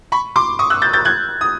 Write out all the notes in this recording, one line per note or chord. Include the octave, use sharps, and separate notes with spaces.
B5 C#6
C6 D6
C#6 D#6
E6 F#6
G6 A6
G6 A6
F#6 G#6
D#6